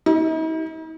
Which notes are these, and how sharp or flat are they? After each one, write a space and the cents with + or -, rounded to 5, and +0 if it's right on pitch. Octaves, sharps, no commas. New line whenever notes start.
D#4 +45